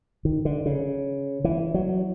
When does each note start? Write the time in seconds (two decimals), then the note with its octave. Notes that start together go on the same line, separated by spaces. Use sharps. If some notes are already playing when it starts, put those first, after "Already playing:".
0.25 D#3
0.45 D3
0.66 C#3
1.44 E3
1.74 F#3